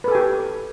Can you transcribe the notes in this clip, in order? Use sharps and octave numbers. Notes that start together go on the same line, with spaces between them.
G4 A4 B4 G#5